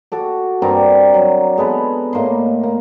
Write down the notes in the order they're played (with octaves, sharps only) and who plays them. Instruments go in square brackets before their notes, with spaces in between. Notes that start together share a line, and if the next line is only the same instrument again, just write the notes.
[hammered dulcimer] F#4 A4 D6
G2 C4 A#4 D5
F#3
G#3 B3 A4 B4
A2 A#3 D#5 C6
A#3